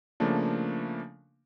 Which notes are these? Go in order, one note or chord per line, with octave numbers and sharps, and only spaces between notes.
C#3 F3 A3 A#3 D4